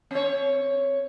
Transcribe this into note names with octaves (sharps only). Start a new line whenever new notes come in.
C4 C#5